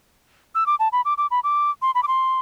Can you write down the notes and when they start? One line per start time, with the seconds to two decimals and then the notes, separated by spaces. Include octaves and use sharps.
0.55 E6
0.66 D6
0.79 A5
0.92 B5
1.05 D6
1.18 D6
1.31 B5
1.44 D6
1.82 C6
1.95 B5
2.03 D6
2.08 C6